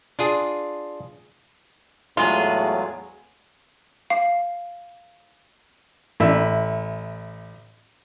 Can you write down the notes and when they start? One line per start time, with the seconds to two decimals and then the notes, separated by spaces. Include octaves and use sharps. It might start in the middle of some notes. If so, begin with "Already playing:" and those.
0.19 D4 F4 G#4
2.17 E2 A2 F#3 G#3 B3 F4 G#4
4.10 F5
6.20 A1 E4 E5